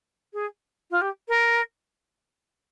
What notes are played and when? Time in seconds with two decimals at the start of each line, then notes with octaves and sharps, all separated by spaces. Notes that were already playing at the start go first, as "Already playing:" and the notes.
0.33 G#4
0.91 F4
1.01 G4
1.28 A#4